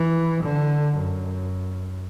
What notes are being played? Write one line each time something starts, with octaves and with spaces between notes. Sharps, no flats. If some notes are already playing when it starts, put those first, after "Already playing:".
Already playing: E3
D3
F#2